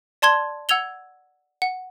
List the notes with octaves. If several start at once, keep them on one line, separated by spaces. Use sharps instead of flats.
D5 A5 C6 G#6 G7
F#5 E6 G#6 F7 G7
F#5